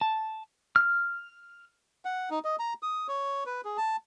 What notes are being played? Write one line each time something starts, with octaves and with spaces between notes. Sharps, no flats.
A5
F6
F#5
D#4
D#5
A#5
D#6
C#5
B4
G#4
A5